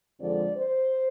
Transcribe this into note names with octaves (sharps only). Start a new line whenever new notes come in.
F2 D3 F3 G#3 D5
C5